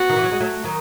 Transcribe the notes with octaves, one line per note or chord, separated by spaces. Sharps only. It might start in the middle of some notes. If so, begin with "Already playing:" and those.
Already playing: B3 F#4
D#3
E3
F#3
G#3
F#3 A3
D#3 F#3